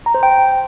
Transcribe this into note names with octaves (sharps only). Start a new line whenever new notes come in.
A#5
C5
G5